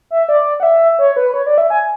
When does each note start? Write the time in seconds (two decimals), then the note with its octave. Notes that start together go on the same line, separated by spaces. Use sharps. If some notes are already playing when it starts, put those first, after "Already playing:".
0.11 E5
0.29 D5
0.60 F#5
0.63 E5
0.99 C#5
1.16 B4
1.34 C#5
1.46 D5
1.58 E5
1.70 G#5